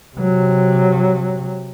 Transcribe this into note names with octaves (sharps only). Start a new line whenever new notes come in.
C3 F#3